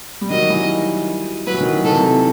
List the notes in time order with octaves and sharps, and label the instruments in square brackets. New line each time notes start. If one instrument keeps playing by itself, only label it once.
[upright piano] G3
[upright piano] D#3 F#3 [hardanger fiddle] D#5
[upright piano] E3 G3
[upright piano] F#3 [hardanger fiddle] B4
[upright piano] E3
D#3 F#3
[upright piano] D#3 F#3 [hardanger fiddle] A4
[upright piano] C3 E3